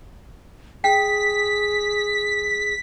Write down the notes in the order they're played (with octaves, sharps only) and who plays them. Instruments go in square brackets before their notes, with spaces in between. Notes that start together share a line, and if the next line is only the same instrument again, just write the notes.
[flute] G#4 [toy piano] G5 [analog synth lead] B6